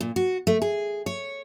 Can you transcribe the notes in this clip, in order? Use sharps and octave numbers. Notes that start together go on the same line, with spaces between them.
A#2
F#4
A3
G#4
C#5